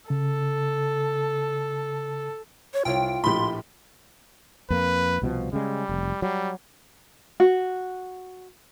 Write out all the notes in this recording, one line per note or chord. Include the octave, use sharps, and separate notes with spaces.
C#3 A4
C#5
C2 F4 C#5 G5
A#1 A2 G4 B5 C6
F2 A#3 B4
C2 B2 F3
C#3 G3 G#3
F1
F#3 G3
F#4